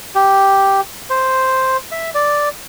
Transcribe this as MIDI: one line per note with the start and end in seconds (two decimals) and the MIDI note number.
0.15 0.81 67
1.10 1.77 72
1.92 2.10 76
2.15 2.49 74